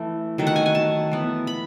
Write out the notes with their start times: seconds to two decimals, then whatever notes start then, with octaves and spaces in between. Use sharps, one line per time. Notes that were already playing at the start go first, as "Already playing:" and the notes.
Already playing: E3 A3
0.38 D#3 F#3 A3
0.47 F#5
0.56 G#5
0.66 G#5
0.75 A5
1.12 E3 B3
1.47 B5